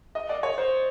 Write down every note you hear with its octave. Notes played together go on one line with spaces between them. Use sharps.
D#5
D5
C#5
C5